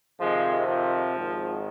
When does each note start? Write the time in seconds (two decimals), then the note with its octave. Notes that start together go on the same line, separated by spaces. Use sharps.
0.20 F2 C3 D#3 F3 G#3
0.68 F3
1.16 G#1 G#2 D#3